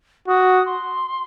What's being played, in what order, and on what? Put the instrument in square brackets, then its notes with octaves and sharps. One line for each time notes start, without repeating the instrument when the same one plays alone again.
[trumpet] F#4 [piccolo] D#6
[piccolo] C6